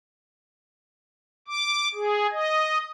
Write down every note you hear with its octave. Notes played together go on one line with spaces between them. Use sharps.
D6
G#4
D#5